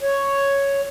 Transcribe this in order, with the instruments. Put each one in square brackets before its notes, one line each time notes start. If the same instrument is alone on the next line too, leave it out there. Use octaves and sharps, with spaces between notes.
[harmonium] C#5